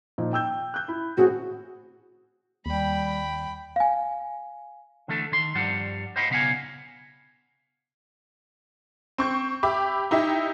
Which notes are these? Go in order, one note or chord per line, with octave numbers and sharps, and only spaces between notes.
A#2 F3 D#4
G5 E6 G6
F#6 G6
E4
A2 C4 F#4 G#4
D#2 G3 G5 B5
F5 G#5
D3 E3 A3 A4
D#3 C6
G2 F3 G3 C5 F#5
C5 D#5 F5 F#5 B5 C6
B1 C#3 B3 F5 F#5 G#5
C4 C#6 G6
G4 E5 B5 D6
D#4 E4 G4 E5